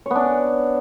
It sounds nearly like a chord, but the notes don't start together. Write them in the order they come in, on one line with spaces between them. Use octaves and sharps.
C#5 B3 D4